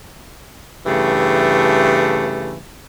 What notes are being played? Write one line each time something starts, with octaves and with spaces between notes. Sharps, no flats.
G2 C#3 E3 A3